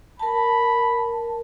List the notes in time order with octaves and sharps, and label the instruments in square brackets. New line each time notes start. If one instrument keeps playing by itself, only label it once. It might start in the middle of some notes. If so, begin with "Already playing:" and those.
[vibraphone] A#4 A5 [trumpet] B5